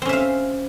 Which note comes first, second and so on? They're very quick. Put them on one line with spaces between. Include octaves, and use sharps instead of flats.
C4 C#4 E5 F5